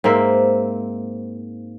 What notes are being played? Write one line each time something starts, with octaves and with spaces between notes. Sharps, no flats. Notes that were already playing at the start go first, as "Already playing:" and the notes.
G#2 A#3 C4 E5